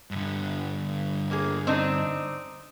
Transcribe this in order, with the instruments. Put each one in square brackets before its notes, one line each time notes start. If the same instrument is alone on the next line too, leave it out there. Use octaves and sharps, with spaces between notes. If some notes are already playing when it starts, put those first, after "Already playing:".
[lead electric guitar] G2 D3
[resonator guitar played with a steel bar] A#3 G#4
C4 D4 D#4